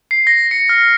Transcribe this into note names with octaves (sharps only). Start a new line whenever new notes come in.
C7
A#6
C#7
F6